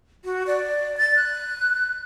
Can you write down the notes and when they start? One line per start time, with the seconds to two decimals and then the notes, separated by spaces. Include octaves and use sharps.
0.24 F#4
0.47 D5
0.98 A6
1.16 F#6